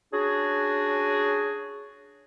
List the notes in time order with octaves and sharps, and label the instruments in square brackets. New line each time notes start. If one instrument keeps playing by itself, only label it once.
[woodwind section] C#4 D4 F#4 G#4